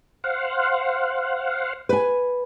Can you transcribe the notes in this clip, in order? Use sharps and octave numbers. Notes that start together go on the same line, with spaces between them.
C5 F5 F#5
B4 G#5